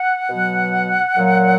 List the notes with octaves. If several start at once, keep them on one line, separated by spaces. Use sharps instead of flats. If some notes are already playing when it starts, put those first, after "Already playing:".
Already playing: F#5
B2 F#3
A#2 F#3